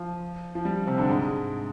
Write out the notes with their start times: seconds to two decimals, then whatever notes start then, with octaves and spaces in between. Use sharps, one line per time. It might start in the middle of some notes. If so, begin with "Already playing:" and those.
Already playing: F3
0.55 F3
0.65 G3
0.87 C3 C4
0.98 D3 D4
1.09 G#2 G#3